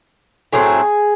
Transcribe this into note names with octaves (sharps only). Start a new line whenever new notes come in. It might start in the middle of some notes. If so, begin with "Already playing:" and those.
A2 F#3 A3 C4 G#4